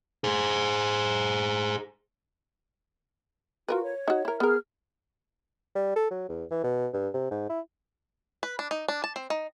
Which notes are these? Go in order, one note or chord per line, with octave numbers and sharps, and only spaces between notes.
G#4 C5
F4 F#4 A#4 B4
C#5
D#4 F#4
E4 A#4
B3 G#4 A#4 F6
G3
A4
F#3
E2
E3
B2
G2
C3
G#2
E4
B4
D4
D#4
D4
A5
C4
D#4